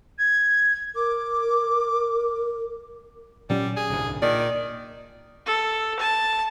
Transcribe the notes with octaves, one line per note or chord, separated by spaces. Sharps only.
G#6
A#4 D6
A#2 F#3 G3 C#4
G#4
D1 C2 G2
A#2 D#3 D5
A4
A5